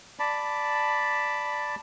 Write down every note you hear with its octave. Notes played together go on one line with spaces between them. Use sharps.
D5 A5 B5